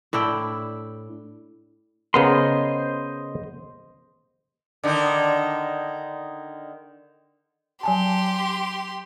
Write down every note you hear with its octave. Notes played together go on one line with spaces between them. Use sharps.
A2 D4 E4 G5
C#3 B3 A#4 C5 D#5 C6
D3 D#3 D#4
F#3 G4 G#5 A5 C6